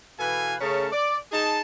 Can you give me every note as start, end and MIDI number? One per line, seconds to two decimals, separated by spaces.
0.20 0.55 47
0.20 0.55 52
0.20 0.55 69
0.20 0.55 71
0.20 0.55 77
0.20 0.55 80
0.60 0.88 49
0.60 0.88 57
0.60 0.88 61
0.60 0.88 68
0.60 0.88 70
0.60 0.88 81
0.92 1.17 74
1.32 1.61 63
1.32 1.61 68
1.32 1.61 81